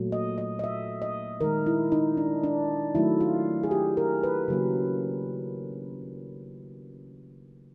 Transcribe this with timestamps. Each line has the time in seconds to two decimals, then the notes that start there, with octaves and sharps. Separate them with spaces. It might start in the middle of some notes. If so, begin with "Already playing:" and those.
Already playing: A#2 F#3 A3
0.12 D#5
0.38 D#5
0.59 D#5
0.64 E5
1.02 D#5
1.41 D#3 G#3 A#4
1.66 E4
1.92 D#4
2.17 D4
2.44 D4
2.95 D#3 F#3 A3 E4
3.21 F4
3.63 G#4
3.71 G4
3.97 A#4
4.23 B4
4.48 C#3 F#3 A#3